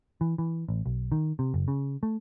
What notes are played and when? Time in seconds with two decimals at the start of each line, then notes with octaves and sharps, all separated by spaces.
0.21 E3
0.38 E3
0.69 A1
0.86 B1
1.12 D#3
1.39 C3
1.54 F#1
1.68 C#3
2.03 A3